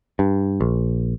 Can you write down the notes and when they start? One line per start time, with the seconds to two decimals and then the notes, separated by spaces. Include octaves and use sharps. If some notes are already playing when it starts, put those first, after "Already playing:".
0.19 G2
0.61 A#1